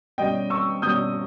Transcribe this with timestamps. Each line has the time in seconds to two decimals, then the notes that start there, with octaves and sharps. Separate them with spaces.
0.18 B2 G3 C#4 D#5 G5
0.50 C#6 E6
0.82 B2 G3 C#4 D#6 G6